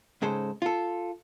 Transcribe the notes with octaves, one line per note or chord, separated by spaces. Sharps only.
G#2 C#3 G#3 A4 C5
F4 A4